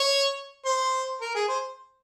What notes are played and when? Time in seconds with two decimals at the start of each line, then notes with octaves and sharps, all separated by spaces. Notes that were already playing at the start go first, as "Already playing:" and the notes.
Already playing: C#5
0.65 C5
1.21 A#4
1.35 G#4
1.49 C5